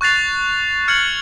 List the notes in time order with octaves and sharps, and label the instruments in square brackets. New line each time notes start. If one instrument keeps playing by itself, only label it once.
[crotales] C#6 F#6 A6 C7 F7
F6 G#6 C#7 F#7